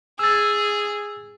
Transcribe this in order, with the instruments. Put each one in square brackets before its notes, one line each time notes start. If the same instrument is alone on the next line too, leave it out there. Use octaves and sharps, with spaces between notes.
[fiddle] G#4 [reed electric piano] E6 A6